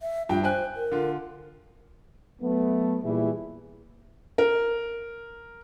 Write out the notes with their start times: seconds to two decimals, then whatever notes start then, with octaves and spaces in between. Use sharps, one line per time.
0.01 E5
0.29 G2 F4 G5
0.44 C5 G5 G#5 F#6
0.76 A#4
0.92 D3 F4
2.42 F#3 A3 B3
3.03 A#2 E3 G3 E4 G#4
4.38 A#4